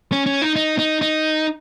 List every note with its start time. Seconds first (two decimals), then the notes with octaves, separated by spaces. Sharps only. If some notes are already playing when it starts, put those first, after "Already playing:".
0.12 C#4
0.26 C#4
0.42 D#4
0.56 D#4
0.78 D#4
1.01 D#4